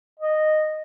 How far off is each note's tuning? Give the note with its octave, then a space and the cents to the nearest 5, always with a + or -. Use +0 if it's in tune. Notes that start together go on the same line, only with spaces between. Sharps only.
D#5 -10